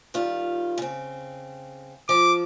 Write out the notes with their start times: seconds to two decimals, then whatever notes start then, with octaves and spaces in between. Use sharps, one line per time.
0.14 D#3 G3 F4
0.78 C#3 C4
2.09 F3 D6